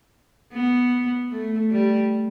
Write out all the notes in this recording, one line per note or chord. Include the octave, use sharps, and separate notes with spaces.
B3
A3
G3